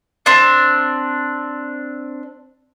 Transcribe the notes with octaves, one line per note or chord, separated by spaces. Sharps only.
C4 D4